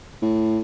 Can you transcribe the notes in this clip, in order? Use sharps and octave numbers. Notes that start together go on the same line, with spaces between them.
A2